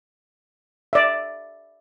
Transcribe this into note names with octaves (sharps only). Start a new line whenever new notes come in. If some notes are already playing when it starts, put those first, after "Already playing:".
D5 E5